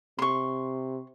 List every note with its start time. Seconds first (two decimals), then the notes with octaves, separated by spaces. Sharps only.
0.19 C3 C6 C#6